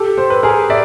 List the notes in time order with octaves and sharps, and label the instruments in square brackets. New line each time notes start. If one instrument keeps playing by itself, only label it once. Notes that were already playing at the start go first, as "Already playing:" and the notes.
Already playing: [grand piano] G4 A4
C5
B4
G#4 A#4
D5 E5